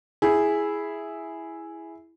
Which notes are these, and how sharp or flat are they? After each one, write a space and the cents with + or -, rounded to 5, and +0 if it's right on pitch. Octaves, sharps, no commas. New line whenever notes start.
E4 +0 G#4 +0